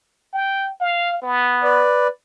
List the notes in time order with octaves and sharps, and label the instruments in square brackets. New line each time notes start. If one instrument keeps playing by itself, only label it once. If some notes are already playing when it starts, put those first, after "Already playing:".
[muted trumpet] G5
F5
B3
[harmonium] B4 D5